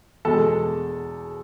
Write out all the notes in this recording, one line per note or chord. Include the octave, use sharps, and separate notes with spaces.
E2 B2 G#3 A4 A5